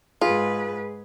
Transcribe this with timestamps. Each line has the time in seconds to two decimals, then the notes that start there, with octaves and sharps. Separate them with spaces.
0.21 G#2 F4 G#4 B4